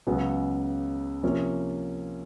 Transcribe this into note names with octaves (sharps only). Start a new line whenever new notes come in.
C#2 C#3 F#3 B3
C3 F3 A#3 C#4